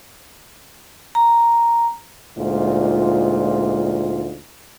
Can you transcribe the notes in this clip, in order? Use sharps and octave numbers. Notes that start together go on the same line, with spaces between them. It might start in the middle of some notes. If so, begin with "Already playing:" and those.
A#5
D2 A#2 G#3 D#4 F4 C5